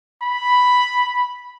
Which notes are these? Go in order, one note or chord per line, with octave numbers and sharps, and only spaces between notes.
B5